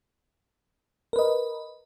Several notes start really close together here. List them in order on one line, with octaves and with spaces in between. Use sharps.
A#4 B4 D#5